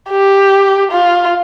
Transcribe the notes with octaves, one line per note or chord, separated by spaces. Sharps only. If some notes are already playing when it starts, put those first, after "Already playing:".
G4
F4